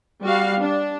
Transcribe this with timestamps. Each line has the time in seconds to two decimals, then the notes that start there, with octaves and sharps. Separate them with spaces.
0.22 G3 F#4 F5
0.59 D4